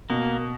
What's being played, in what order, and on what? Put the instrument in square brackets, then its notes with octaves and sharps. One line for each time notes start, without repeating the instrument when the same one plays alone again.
[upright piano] B2 [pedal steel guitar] A#3